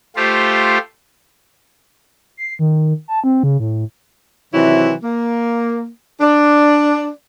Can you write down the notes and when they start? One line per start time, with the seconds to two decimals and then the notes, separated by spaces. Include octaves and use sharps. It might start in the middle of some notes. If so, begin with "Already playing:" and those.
0.16 A3 F4 G4 C5
2.37 C7
2.59 D#3
3.08 A5
3.24 C4
3.43 C#3
3.60 A2
4.53 C3 D#3 E3 F#3 E4
5.03 A#3
6.21 D4